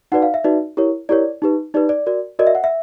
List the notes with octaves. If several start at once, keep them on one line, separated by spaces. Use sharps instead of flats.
D#4 F#4 B4 D5 F#5
F5
E5
D#4 F#4 B4 D5
E4 G4 A#4 C#5
E4 G4 A#4 C#5 D5
D#4 G4 B4
D#4 G4 B4 D5
D5
F#4 A#4 D5
F#4 A#4 D5 D#5
E5
F#5
E5